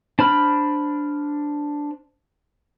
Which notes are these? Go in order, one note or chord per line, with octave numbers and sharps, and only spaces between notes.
D4 C5 B5 F6